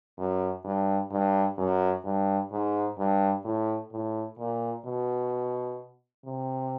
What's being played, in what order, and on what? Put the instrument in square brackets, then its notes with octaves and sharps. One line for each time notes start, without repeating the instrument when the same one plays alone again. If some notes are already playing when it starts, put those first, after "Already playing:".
[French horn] F#2
G2
G2
F#2
G2
G#2
G2
A2
A2
A#2
B2
C3